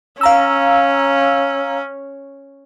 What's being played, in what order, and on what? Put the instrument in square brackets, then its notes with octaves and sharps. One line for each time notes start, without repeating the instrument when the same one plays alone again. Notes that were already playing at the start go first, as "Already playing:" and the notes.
[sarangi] C#4 [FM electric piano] F5 A#5 E6